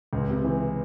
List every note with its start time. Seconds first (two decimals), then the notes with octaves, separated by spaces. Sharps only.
0.13 C#2
0.29 C3
0.44 E3